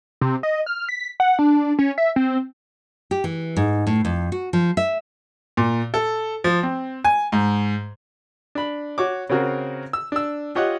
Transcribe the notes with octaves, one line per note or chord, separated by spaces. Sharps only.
C3
D#5
F6
B6
F#5
D4
C#4
E5
C4
G4
E3
G#2
A2
F2
F#4
F3
E5
A#2
A4
F3
C4
G#5
G#2
D4 B5
F#4 C#5 D6
C#3 C4 C#4 F#4 A#4
E6
D4 E6
F4 G4 C#5 D#5 F#5